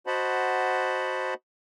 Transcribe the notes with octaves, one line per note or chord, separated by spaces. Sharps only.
F#4 C5 D#5 F#5 A5 B5